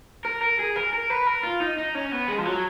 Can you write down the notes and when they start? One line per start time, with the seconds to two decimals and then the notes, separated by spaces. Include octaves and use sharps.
0.25 A#4
0.42 A#4
0.59 G#4
0.76 A#4
0.93 A#4
1.10 B4
1.27 A#4
1.43 F4
1.60 D#4
1.78 D#4
1.95 C#4
2.12 B3
2.28 G#3
2.38 F3
2.45 F#3